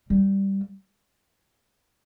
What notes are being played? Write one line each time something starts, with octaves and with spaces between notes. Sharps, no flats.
G3